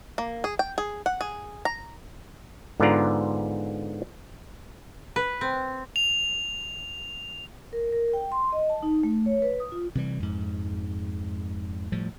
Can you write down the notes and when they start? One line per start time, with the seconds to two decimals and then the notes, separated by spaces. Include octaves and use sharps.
0.18 A#3
0.44 G#4
0.59 G5
0.78 G#4
1.06 F#5
1.21 G#4
1.65 A#5
2.80 G#2 D3 B3 F4 D5 A#5
5.16 B4
5.41 C4
5.96 F7
7.73 A#4
7.92 A#4
8.13 G5
8.32 C6
8.52 D#5
8.70 A5
8.83 D#4
9.03 A3
9.26 C#5
9.42 B4
9.60 D#6
9.72 F4
9.95 C3 E3 G3
10.20 F2 G#2
11.92 A2 F3 G3